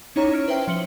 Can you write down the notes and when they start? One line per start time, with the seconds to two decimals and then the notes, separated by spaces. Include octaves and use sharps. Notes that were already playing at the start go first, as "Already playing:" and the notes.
0.16 C#4 D#4 E4 C#5 A#5
0.33 F6 D7
0.48 B4 C5 E5 G5
0.68 F3 C#7 F#7 G7